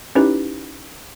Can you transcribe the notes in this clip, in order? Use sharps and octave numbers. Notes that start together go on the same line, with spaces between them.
C#4 D#4 E4 G4 B4